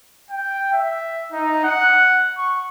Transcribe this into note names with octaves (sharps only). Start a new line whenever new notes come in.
G5
E5
D#4
F#5
C#6